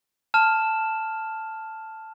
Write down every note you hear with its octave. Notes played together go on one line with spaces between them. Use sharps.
A5 F6 E7